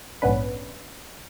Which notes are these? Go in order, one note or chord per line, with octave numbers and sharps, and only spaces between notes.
A#1 G#2 B3 C#4 D4 B4